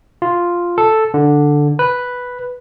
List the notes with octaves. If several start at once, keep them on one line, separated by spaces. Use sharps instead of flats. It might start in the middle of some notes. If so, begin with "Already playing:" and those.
F4
A4
D3
B4